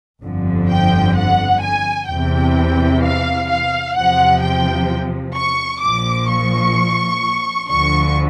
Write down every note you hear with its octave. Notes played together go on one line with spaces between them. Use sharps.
G1 F2 D3 F3
G5
F#5
G#5
E2 C3 E3 G5
F5
F5
E2 C3 F3 F#5
G5
C#6
A#1 A#2 F3 D6
C#6
D2 D3 F3 C#6